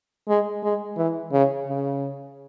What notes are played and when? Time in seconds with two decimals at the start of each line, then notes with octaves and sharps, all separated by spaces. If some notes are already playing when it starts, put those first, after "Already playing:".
0.28 G#3
0.63 G#3
0.97 E3
1.32 C#3
1.67 C#3